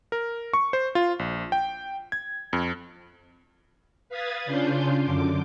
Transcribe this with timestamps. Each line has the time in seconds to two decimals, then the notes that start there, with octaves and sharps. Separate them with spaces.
0.12 A#4
0.53 C#6
0.73 C5
0.95 F4
1.19 A#1
1.52 G5
2.12 G#6
2.53 F2
4.09 B4 F5 B5 D#6 G#6 A6
4.45 C#3 C#4 D4 F4 C6 G6
5.04 F#2 D3 D6